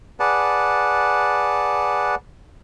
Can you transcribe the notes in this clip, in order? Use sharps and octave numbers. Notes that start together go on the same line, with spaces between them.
G#4 B4 D5 F#5 A5